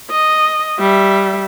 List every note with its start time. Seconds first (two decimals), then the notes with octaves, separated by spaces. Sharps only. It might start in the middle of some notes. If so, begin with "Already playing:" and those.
0.11 D#5
0.80 G3 E5